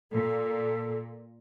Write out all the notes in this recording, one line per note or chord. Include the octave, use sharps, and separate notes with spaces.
A#2 A4